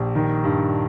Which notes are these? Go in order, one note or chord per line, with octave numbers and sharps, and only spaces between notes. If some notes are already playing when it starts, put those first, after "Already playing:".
Already playing: A#1 G4
D#3
G2